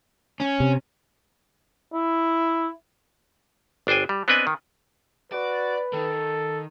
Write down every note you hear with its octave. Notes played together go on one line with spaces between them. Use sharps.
C#4
C3
E4
G1 D4 C5 G5 G#5
G3
B3 C4 D4 B4 D#5 G#5
D#3
F#4 B4 D5
D#3 A4